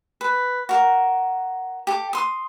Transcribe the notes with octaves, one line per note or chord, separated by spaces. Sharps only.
B4
F#4 A#4
G4 A4
C6 D#6